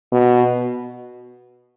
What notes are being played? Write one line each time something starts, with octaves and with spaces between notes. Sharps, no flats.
B2